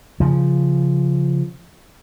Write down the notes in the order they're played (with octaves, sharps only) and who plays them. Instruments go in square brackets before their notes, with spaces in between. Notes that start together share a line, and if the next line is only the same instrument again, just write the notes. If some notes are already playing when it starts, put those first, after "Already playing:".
[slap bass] C#3 F3